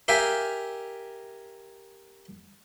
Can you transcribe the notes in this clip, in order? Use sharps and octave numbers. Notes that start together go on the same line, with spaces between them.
G4 A#4 E5 F5 G5 G#5